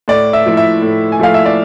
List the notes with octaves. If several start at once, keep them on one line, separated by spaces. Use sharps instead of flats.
A2 D5
E5
F3 A3 E4
E5
A2
G#5
F3 A3 E4 F5
E5
D5